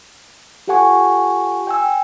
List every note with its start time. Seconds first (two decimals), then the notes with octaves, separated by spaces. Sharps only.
0.67 F4 G4 A4 F#5 G#5 C#6
1.67 G5 G#5 E6